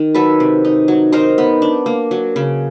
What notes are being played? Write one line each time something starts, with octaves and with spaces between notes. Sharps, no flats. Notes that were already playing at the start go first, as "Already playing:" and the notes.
Already playing: D#3
F#3 A4 B4
C3
D#4
F#3
D#4 A#4 C5
B3
D4
A#3
F#3
C#3